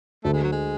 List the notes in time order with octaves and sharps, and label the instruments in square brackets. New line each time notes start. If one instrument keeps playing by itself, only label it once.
[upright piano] D2 [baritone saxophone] A3
[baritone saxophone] G#3
F#3
G#3